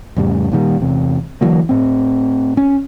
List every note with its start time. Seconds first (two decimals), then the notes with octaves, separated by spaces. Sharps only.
0.17 F2 A2 C#3 G3
0.52 A#2 D#3 G3
0.80 E2 C3
1.41 D3 E3 F#3 A#3
1.69 A2 C4
2.57 C#4